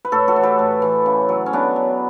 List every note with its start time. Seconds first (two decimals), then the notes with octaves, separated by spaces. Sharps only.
0.05 B4
0.12 A2 A4 C#5
0.28 F#4 A4
0.36 E3
0.43 G4 B4
0.59 A2
0.82 E3
1.06 C#3
1.29 F#3
1.46 C#4
1.53 C#3 B3 D4
1.76 F#3